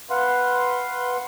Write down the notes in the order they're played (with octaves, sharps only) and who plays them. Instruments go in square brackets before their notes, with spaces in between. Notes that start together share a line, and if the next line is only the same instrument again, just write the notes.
[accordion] B4 F5 F#5 C6